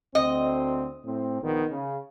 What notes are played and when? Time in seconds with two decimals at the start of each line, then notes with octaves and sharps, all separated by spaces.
0.15 D2 C4 D#5
1.05 A2 C4
1.41 A#1 D#3 B3
1.69 C#3